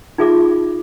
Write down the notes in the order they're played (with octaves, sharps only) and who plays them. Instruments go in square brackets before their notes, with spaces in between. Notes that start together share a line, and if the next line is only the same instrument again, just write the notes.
[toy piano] D#4 F4 G#4 E5 D6